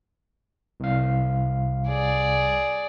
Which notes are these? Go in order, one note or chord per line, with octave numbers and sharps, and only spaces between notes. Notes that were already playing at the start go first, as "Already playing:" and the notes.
C2 F5
G#4 D5